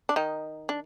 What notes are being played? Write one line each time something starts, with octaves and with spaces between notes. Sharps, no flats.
D4
D#3 D#4
D4